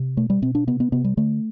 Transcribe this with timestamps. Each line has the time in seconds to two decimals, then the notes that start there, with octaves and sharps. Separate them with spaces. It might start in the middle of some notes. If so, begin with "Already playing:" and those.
Already playing: C3
0.17 B2 A3
0.30 G3
0.42 B2 C4
0.55 D4
0.67 C3 B3
0.80 B3
0.92 C3 B3
1.04 G3
1.17 D3 A3